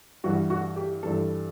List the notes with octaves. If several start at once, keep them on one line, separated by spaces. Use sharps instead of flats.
G2 E3 G3 F#4
F#4
G4
G2 E3 G3 A4